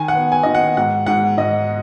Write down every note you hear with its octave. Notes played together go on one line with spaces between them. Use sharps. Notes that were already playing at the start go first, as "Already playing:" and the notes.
Already playing: D#3 G#5
F#5
B3
G#5
D#3 D#5
F#5
G#2 F#5
G#2 F#5
G#2 D#5